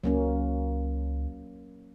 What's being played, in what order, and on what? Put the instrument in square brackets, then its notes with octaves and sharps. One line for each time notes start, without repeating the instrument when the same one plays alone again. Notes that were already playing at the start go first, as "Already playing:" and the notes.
[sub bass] C#2 [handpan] F#3 A#3 C#4